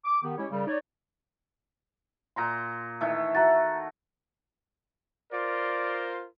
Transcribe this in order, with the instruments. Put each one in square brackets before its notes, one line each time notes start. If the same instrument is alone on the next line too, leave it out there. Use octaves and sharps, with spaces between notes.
[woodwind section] D6
D#3 B3 G4
G#3 C#4 E4 G4 C#5
F#2 C#3 G3
D#4 C#5 D5
[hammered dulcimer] A#2 A#5 C6
D#3 E3 A3
[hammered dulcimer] F#4 [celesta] E5 A#5 A6
[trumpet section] F4 A#4 C5 [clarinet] D5